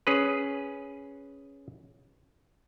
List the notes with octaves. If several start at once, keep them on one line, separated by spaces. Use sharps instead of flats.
C#4 G#4 B4